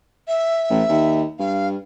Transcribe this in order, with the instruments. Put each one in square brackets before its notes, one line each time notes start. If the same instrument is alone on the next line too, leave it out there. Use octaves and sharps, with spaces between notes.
[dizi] E5
[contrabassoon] A1
D#2
[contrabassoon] G2 [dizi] F5